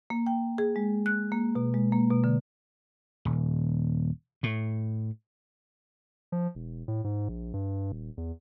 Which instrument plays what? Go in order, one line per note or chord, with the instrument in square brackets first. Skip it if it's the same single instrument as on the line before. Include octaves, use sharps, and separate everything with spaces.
[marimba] A#3
G5
G#4
G#3
F#6
A#3
B2
G#3
A#3
B2
D3
[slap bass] D#1
A2
[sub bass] F3
E1
A2
G#2
A#1
G2
D#1
E2